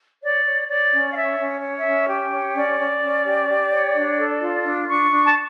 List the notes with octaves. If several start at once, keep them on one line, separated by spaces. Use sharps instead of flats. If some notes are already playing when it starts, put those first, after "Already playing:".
C#5 D5
C#5
C#5 D5
C#4
F5
C#5 E5
C#4
C#5
E5
C#4
G4
C#5
C#4 D5
C#4
C#4
G4
G4
C#5
D4
A4
F4
D4
D4 C#6
D4
A5